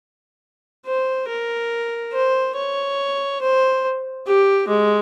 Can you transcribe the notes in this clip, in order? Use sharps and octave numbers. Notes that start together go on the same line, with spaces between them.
C5
A#4
C5
C#5
C5
G4
G#3